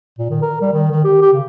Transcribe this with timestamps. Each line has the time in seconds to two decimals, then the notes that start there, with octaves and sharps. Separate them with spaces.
0.19 A#2
0.31 D#3
0.42 A#4
0.61 G3
0.73 D#3
0.91 D#3
1.04 G4
1.22 G4
1.33 C#3